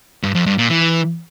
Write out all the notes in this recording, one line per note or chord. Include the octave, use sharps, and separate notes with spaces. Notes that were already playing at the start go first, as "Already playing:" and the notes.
G2
F2
G2
A#2
E3